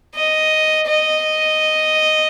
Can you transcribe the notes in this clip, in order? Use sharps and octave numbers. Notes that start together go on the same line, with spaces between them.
D#5
D#5